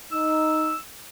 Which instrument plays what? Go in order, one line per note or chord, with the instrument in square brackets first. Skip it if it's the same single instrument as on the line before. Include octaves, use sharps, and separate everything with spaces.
[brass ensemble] D#4 [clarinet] E6